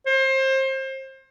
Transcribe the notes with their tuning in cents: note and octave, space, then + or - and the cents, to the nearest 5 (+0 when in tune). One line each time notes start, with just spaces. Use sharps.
C5 +30